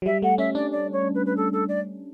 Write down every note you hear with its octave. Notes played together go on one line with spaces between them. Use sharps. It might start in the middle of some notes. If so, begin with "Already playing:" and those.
F#3
G3 E5
A3 F#5
C#4 E5
D4 D5
D5
C#5
B4
B4
A4
A4
D5